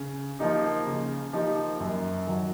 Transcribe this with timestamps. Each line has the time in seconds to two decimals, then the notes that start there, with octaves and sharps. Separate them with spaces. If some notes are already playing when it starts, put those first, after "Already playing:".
Already playing: C#3
0.39 F3 A#3 D#4 G4
0.86 C#3
1.33 F3 A#3 D#4 G4
1.80 F#2
2.27 D#3 F#3